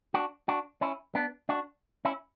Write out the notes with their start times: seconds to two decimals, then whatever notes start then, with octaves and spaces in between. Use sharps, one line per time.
0.14 D4 F#4
0.48 D4 F#4
0.81 C#4 E4
1.15 B3 D4
1.49 D4 F#4
2.05 C#4 E4